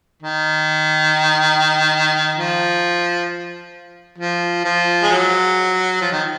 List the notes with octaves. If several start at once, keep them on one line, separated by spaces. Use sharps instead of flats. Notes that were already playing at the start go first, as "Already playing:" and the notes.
D#3
F3
F3
F3
G#3
F#3
F3
D#3